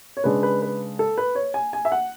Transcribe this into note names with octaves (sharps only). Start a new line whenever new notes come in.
C#5
C#3 G#3 D4 B4
B4
B4
A4
B4
C#5
G#5
G#5
E5
F#5